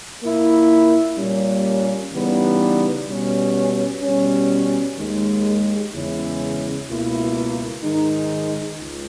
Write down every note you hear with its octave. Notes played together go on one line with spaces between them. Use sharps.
A#2 A#3 E4
A#2 G3 A#3 C#4
C#3 E3 G3 B3 D#4
B2 G3 C#4
B2 G3 C#4
D#2 D#3 G#3
E2 C#3 G#3 C#4 E4
C#2 B2 A#3 E4
G#2 D#3 G#3 D#4
C#2